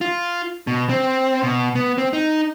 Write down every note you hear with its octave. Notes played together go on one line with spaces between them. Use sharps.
F4
B2
C4
B2
B3
C4
D#4